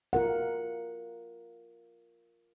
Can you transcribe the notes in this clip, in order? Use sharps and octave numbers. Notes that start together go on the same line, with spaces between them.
F4 A#4 F#5